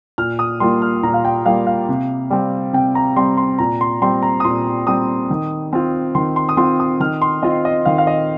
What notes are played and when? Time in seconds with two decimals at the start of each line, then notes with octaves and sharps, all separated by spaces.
0.18 A#2 F6
0.39 D#6
0.60 G3 A#3 F4 C6
0.82 F6
1.03 A#2 A#5
1.14 F5
1.25 G5
1.46 G3 A#3 F4 F5
1.67 F5
1.89 C3
2.30 G3 C4
2.73 C3 G5
2.95 A#5
3.16 G3 C4 C6
3.37 C6
3.59 A#2 A#5
3.81 C6
4.02 G3 C4 C6
4.22 A#5
4.40 D#6
4.44 A#2 C6
4.87 G3 C4 D#6
5.30 D#3
5.73 C4 F4
6.15 D#3 C6
6.36 C6
6.49 D#6
6.57 C4 F4 C6
6.80 D#6
7.00 D#3 F6
7.22 C6
7.42 C4 F4 D#5
7.65 D#5
7.85 D#3 F5
7.98 F5
8.07 D#5